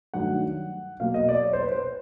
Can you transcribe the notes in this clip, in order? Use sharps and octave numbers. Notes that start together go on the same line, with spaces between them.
G2 D#3 F#3 A3 F#5
B2 F#3 A#3 F5
D#5
D5
C#5
C5
B4
C5